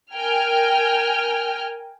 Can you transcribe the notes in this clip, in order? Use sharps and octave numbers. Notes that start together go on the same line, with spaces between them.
A#4 G5 G#5 F6